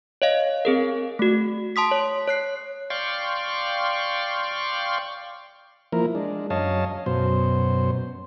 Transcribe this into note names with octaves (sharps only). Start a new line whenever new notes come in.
C#5 D#5 F5
C4 G#4 A#4
A3 F#4
A5 C6 D#6 B6
C#5
C#5 F#6 C7
D5 F5 G5 C6 C#6
F3 A#3 E4 A#4
G#3 D4
F#2 C#5 D#5 F5 A5
F#2 B2 C5